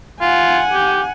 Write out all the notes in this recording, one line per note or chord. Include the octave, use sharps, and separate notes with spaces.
F4 F#5 G#5
G4